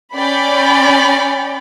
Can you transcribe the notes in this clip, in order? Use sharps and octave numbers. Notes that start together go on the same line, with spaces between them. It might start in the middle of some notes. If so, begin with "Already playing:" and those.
C#4 D5 G5 B5